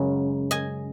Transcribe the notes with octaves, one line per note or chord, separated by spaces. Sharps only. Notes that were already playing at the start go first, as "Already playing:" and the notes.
Already playing: F#2 C#3 G#3
D#5 G#5